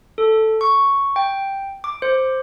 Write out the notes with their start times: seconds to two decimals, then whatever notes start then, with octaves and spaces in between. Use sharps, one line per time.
0.18 A4
0.61 C#6
1.16 G5
1.84 D6
2.02 C5